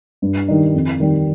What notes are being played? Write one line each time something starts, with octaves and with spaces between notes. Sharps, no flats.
G2
D#3 G3 D#4
F2
D#3 G3